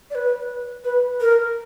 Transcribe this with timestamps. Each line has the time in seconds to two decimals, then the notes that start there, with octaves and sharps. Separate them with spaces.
0.10 D5
0.15 B4
0.84 B4
1.21 A#4